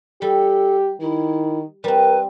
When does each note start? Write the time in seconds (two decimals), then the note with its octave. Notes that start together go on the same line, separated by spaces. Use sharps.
0.22 G3 G4 A4
1.01 D#3 E4
1.84 G3 C4 A#4 B4